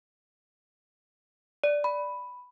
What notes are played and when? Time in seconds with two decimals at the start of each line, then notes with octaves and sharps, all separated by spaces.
1.64 D5
1.84 B5